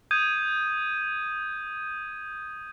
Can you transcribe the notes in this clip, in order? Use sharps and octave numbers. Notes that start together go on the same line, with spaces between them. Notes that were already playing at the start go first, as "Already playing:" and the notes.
D#6 G6 G#6 D#7